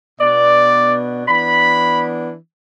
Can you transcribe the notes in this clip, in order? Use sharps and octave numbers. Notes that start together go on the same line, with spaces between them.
B2 B3 D4 D5
E3 B3 D4 B5